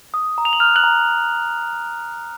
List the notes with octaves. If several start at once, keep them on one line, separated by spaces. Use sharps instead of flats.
D#6
A#5
F7
F#7
F6 F#6 F7
F#6 F#7
A#5